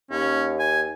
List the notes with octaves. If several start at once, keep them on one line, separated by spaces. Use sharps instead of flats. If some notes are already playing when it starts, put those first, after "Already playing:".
D#2 C#4
G#5